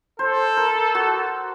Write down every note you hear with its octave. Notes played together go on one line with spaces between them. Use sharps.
A4 C5
A#4
F#4